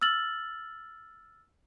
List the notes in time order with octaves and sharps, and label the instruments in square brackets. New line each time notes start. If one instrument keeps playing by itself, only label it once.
[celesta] E6 F6 A6 F#7